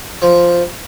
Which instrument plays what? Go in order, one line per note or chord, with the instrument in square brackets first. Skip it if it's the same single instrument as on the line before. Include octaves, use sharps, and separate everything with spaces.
[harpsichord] F3